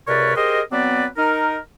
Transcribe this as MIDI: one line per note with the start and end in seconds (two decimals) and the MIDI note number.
0.07 0.36 37
0.07 0.36 48
0.07 0.36 70
0.07 0.36 71
0.07 0.36 73
0.07 0.36 74
0.36 0.61 67
0.36 0.61 68
0.36 0.61 70
0.36 0.61 72
0.36 0.61 75
0.72 1.06 54
0.72 1.06 59
0.72 1.06 60
0.72 1.06 71
0.72 1.06 74
1.17 1.57 63
1.17 1.57 70